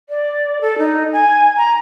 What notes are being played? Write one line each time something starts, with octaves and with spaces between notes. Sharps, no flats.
D5
A4
D#4
G#5
A#5